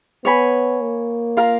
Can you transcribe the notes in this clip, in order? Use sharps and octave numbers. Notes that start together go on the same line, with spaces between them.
B3 C#5 G#5 B5
A#3
F4 A#4 F5